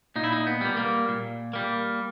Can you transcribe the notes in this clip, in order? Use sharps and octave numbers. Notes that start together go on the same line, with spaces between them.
A#2 D#4
E4
D#4
B3
G3 A#3
A#3
A#2
G3 A#3